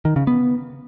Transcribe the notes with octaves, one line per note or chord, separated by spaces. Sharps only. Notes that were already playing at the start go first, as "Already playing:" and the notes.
D#3
C#3
B3